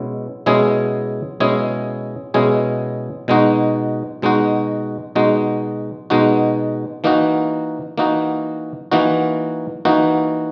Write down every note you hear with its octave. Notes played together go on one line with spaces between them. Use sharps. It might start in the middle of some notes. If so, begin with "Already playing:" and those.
Already playing: B2 G#3 C#4 E4
B2 G#3 C#4 E4 G#4
B2 G#3 C#4 E4 G#4
B2 G#3 C#4 E4 G#4
B2 G#3 D#4 F#4
B2 G#3 D#4 F#4
B2 G#3 D#4 F#4
B2 G#3 D#4 F#4
E3 A#3 D#4 F#4
E3 A#3 D#4 F#4
E3 A#3 D#4 F#4
E3 A#3 D#4 F#4